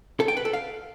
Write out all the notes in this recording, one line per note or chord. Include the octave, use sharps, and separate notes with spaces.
A4
G5
B4
A4
F5